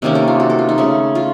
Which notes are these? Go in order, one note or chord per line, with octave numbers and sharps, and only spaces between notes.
C3 D#3 A#3 C#4 D#5
A4
F4
F#4
A4
F4
D#4
C#3 A3 C#4
F4